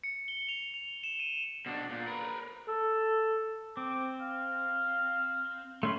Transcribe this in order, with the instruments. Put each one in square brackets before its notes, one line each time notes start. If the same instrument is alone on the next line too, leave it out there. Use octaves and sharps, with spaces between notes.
[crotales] C#7
G7
F7
F7
E7
D#7
[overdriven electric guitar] B2 D4
A#2
A#4 B4
[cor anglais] A4
[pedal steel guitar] C4 [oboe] D6
[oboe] F5
[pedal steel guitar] A3 C#4 B5 [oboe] C6